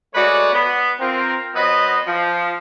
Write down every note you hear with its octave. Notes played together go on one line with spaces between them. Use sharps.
G#3 A3 F#4 B4 C#5 D5
B3
C4 F4 A#4
F#3 B3 C4 B4 D#5
F3